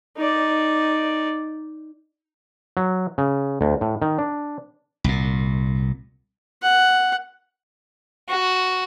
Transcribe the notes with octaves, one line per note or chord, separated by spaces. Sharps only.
D#4 D5
F#3
C#3
D2
A2
D#3
D4
C2 A#2
F#5
F#4